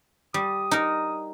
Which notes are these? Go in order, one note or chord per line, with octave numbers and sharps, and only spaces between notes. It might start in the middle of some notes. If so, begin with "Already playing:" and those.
G3 D#6
D#4 A#4